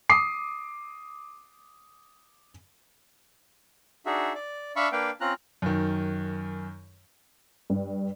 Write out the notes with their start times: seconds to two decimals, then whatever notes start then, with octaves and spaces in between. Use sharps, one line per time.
0.10 D6 D#6 C7
4.06 D4 D#4 F#4 G#4 E5
4.35 D5
4.76 D4 E5 F5 B5 C#6
4.92 A#3 D4 B4 F5 G5
5.21 C4 C#4 F4 A#5 F#6
5.62 F#2 D#3
7.70 G2